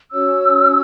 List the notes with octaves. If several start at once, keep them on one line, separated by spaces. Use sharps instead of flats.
C#4 F#4 C#5 E6